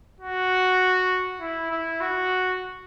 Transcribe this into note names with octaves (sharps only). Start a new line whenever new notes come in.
F#4
E4
E4
F#4